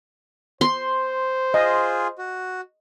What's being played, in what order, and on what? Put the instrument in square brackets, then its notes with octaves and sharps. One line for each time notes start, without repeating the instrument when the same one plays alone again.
[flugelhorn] C5 [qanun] C6
[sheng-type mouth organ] F4 G#4 [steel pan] D#5
[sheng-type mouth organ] F#4